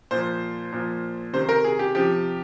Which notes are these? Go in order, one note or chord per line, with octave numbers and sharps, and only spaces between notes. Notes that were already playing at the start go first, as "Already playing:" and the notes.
A#2 F3 C5
A#2 F3
C3 D#3 C5
A#4
G#4
G4
C3 F3 G4